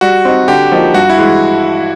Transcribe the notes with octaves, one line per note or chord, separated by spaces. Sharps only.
G3 F#4
C4 D#4
D3 G4
F3 A#3 D#4
G2 F#4
E4
E3 G#3